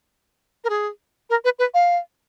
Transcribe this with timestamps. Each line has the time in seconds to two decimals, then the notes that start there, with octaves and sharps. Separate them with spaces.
0.64 A#4
0.70 G#4
1.30 A#4
1.45 B4
1.59 B4
1.74 F5